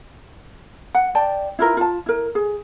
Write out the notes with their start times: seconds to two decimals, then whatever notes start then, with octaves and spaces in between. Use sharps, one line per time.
0.95 F#5
1.15 D5 G5 A5
1.59 E4 F4 A#4 B4
1.77 F4 A5
2.06 E4 A#4
2.35 G#4